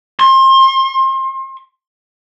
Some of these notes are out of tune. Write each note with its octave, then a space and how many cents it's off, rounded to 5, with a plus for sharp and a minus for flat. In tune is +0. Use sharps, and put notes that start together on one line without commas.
C6 +30